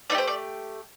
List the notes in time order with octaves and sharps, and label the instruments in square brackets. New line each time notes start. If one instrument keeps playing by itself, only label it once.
[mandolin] A3 D#4 D5
G4 C5
D5